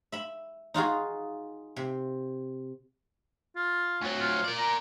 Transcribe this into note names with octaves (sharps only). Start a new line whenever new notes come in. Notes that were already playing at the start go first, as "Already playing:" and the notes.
E5 B5
D#4 F4 F#4 G#4
C3
F4
D2 F#3
F4
A#4 D5
A#5